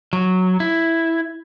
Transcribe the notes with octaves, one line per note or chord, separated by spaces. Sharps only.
F#3
E4